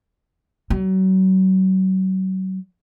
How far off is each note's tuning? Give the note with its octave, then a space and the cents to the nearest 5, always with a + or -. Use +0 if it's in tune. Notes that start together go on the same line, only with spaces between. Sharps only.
F#3 +30